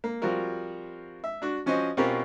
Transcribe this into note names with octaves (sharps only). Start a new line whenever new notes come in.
A#3
F3 G3 C4 F4 F#4 A#4
E5
D4 F#4
F3 C#4 F#4 C5 D#5
B2 C4 C#4 F4 G4 A#4